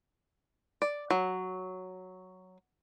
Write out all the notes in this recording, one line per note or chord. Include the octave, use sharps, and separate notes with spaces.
D5
F#3